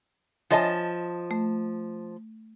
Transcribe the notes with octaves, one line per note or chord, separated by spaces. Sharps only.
F3 C#5 D#5 E5 G#5 A5
A3